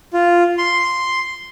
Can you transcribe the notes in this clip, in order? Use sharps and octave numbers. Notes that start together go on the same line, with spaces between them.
F4
C6